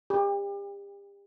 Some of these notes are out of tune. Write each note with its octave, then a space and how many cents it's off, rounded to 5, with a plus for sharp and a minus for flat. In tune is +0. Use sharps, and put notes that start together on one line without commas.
G4 +35